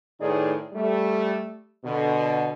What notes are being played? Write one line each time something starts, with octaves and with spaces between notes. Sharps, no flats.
A2 D#3 D#4 G#4 B4 D5
G3 A3
B2 D3